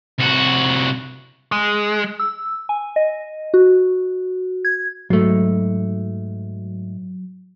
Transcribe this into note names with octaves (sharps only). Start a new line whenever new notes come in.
C2 F#4
G#3
E6
G#5
D#5
F#4
G#6
G#2 F#3 A3